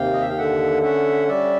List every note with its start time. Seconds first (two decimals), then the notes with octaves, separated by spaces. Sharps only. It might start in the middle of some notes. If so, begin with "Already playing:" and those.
Already playing: D#2 C3 F5 G5
0.13 D#5
0.21 E5
0.29 F5
0.38 D3 E5 F#5
0.83 C#4 E5 F#5
1.28 G3 D5 E5